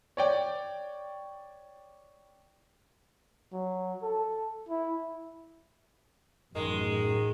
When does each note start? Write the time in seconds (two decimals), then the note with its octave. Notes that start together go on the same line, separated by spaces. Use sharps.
0.17 C#5 D5 G5
3.52 F#3
4.03 A4
4.69 E4
6.55 A1 F#2 D#3 G#3